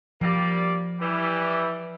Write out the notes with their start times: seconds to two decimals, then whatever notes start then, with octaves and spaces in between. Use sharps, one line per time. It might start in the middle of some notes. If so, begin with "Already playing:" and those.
0.21 F3 G3 A#3 D5
1.00 E3 G3